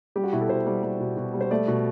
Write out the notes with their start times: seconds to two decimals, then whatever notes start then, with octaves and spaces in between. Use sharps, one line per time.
0.16 G3 G4
0.24 F#4
0.32 B2 E4
0.41 A4
0.49 B2 C5
0.67 G3
0.83 G3
1.00 B2
1.17 B2
1.34 G3
1.41 C5
1.51 A3 D5
1.68 B2